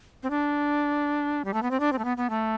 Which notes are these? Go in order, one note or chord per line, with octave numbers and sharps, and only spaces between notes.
C4
D4
G3
A3
B3
C4
D4
C4
A3
B3
B3
A3